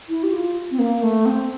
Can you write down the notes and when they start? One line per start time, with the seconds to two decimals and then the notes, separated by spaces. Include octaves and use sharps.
0.09 E4
0.23 G4
0.32 F4
0.71 C4
0.79 A#3
1.02 A3
1.26 C4